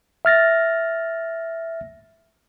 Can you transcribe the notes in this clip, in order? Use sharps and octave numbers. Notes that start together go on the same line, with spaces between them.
E5 F6 A6 A#6